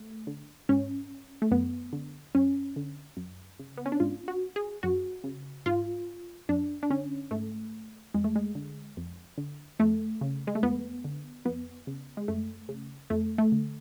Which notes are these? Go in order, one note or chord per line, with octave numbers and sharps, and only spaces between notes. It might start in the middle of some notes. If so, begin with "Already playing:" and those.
Already playing: A3
D3
G#2 C#4
A3
F#2 B3
D3
F#2 C#4
D3
F#2
C#3
B3
C#4
D4
G#2 F4
F#4
G#4
F#2 F#4
C#3
G#2 F4
F#2 D4
D4
D3 C#4
G#2 A3
F2 G#3
A3
G#3
D3
F2
D3
F2 A3
C#3
G#3
A3
F2 B3
D3
F2 B3
C#3
G#3
F#2 A3
C#3
F2 A3
A3
D3